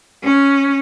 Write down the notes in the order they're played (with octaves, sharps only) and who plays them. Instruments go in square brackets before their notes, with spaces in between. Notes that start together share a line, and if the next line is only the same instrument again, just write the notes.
[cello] C#4